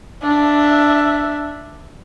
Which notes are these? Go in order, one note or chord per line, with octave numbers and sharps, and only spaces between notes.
D4 E5